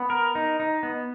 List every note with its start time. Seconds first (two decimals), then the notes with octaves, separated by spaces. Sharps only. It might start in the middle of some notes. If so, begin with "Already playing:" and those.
Already playing: B3
0.10 A#4
0.35 D#4
0.60 D#4
0.83 B3